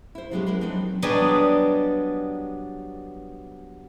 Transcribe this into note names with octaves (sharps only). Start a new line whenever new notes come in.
E4 C5
F3 F#3 G#3 B3 C#4 G4
G#3 E4 A#4 B4
F3 F#3 C4 D4 D#4
F#3 G3 B3 D4 G#4 D#5